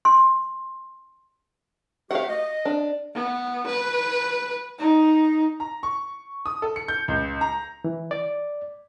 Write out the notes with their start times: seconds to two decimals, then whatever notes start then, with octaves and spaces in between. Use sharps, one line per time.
0.05 C6
2.11 A3 F#4 G4 F5 F#5
2.29 D#5
2.65 D4
3.14 B3
3.67 B4
4.79 D#4
5.60 A#5
5.83 C#6
6.46 D#6
6.62 A4
6.76 C#7
6.88 G6
7.08 C#2
7.41 A#5
7.84 E3
8.11 D5